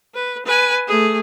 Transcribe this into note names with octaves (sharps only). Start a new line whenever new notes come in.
B4
B4 G#5
A3 G#4